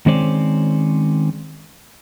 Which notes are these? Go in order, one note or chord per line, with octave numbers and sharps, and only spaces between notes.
D#3 G#3 C4 C#4 C5 D5